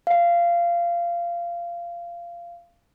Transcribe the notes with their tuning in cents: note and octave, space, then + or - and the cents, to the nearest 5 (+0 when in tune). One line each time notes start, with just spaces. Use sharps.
F5 -20